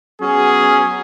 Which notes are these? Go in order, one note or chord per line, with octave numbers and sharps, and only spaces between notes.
F#3 B3 C#4 G#4